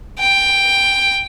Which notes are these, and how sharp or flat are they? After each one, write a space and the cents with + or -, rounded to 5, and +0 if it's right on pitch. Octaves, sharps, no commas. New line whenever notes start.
G5 +5